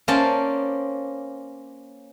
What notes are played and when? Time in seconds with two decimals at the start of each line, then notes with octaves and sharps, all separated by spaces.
0.08 A#3 C#4 C5 D5 A5